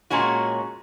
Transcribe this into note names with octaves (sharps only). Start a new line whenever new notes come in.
A#2 G#3 C#4 F#4